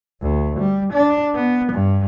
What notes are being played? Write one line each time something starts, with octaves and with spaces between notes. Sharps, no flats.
D2
G3
D4
B3
G2